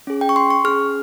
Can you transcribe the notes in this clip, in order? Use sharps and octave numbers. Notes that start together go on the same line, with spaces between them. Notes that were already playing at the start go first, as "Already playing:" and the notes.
C#4 G#4
G5
C#6
C6
C#6
C#4 G#4 F6